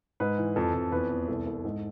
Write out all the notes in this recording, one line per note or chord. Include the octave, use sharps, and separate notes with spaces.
G#2 B4
E3
F2 A4
F2
E2 B4
E2
C2 A4
C2
G#2